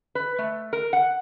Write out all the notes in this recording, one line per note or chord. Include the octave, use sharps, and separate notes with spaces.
B4
A3
A#4
F#5